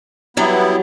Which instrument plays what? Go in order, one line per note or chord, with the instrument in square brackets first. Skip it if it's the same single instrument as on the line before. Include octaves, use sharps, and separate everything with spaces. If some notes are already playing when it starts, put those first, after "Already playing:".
[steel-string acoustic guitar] E3 F#3 G3 [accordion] B3 E4